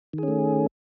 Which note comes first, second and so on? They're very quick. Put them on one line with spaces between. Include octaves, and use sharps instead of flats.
D#3 G#4 C#4 A3